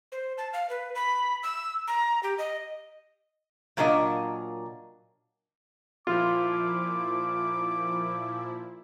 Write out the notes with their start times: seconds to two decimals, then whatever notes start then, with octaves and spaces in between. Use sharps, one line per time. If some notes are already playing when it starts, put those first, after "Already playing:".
0.12 C5
0.38 A5
0.53 F5
0.70 B4
0.95 B5
1.43 E6
1.87 A#5
2.23 G4
2.38 D#5
3.77 A#2 F#3 A#3 D4 D#5
6.07 A#2 F3 E4 F4 D6